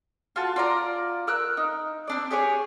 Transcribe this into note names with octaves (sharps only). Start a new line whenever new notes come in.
F4 F#4 A5
F4 D5 A#5
A#4 E6 F#6
D#4
C4 D4 D5
G4 G#4 C#5 G#5